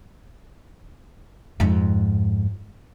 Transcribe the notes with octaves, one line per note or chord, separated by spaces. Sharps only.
F2 G#2